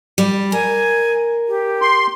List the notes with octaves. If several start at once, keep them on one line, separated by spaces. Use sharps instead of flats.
G3
A#4 G#5
G4
C6